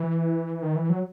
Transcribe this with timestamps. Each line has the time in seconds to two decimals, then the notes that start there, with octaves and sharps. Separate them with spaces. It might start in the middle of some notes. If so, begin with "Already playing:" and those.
Already playing: E3
0.62 D#3
0.76 E3
0.90 F#3